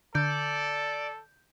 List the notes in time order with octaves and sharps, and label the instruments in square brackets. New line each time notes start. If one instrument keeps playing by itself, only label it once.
[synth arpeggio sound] D3 [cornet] A4 [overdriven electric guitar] D5 [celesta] G6